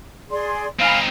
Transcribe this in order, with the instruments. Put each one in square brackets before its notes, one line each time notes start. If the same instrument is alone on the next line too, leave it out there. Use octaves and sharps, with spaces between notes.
[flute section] G#4 D5 C6
[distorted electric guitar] C4 D#4 [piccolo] F5 [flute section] G#5 B5